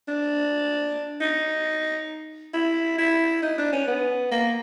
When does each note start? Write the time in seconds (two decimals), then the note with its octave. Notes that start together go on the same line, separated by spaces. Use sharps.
0.08 D4
1.20 D#4
2.54 E4
2.98 E4
3.42 D#4
3.58 D4
3.73 C#4
3.88 B3
4.32 A#3